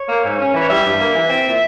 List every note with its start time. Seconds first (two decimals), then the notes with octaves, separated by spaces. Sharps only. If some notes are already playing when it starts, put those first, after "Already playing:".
Already playing: C#5
0.09 A#3
0.24 G#2
0.39 C#4
0.54 E3
0.62 C#5
0.70 G3 E5
0.85 G2
1.00 A#3
1.15 E3
1.30 C4
1.45 A#2